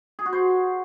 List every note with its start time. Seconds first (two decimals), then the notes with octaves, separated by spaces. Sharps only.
0.19 G#4
0.26 F#4
0.33 C5